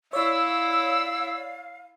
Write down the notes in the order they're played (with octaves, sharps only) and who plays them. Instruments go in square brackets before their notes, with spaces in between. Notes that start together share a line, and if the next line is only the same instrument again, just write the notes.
[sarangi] E4 [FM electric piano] C#5 D5 [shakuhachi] F5 [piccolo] E6